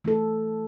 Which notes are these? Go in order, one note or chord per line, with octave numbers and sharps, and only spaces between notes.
E3 A3 E4 A4